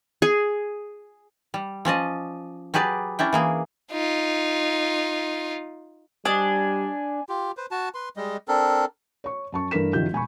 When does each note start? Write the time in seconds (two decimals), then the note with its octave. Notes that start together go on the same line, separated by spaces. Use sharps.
0.22 G#4
1.54 G3
1.85 F3 C#4 D5 D#5
2.74 F#3 G4 G#4 B4 D5
3.19 C#4 D4 E4 G5
3.33 E3 A#3 G#4
3.92 D#4 F4
6.25 G3 D4 D#5 G#5
7.29 F4 G4
7.57 B4 C5
7.71 F#4 A5
7.95 B4 C6
8.17 G3 G#3 D#5
8.48 C4 D4 A4 A#4
9.24 C#5 C#6
9.52 F#2 A5 C#6
9.71 G2 E3 A3 A#4 B6 E7
9.93 F#1 D#3 F3 F#3 G4 G6
10.13 E1 G#5 B5 C#6